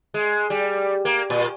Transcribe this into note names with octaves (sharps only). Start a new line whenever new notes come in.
G#3
G3
A#3
A#2